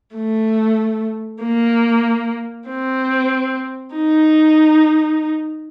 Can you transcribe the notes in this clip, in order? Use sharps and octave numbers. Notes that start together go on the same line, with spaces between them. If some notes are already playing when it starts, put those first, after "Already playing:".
A3
A#3
C4
D#4